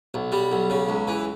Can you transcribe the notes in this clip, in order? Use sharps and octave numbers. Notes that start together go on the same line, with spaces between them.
B1
G3
B1
C#3
C#2
E3